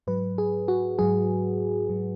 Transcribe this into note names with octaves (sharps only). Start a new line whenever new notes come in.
G#2 F#3 B4
G#4
F#4
G#2 F#3 G#4
G#2 F#3